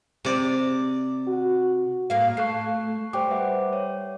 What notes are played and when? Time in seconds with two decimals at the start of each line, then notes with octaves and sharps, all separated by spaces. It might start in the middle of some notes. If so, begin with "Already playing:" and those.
0.25 C3 D5
1.28 F#4
2.10 A2 A#3 F5
2.37 A3 C#6 F#6 C7
3.13 G3 C5 G5 D6
3.31 B4 E5 F#5
3.73 C#5